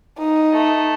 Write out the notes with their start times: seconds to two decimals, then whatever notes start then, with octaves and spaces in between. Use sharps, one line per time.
0.18 D#4
0.53 A3